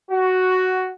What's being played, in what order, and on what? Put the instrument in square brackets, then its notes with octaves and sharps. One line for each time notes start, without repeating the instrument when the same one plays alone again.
[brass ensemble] F#4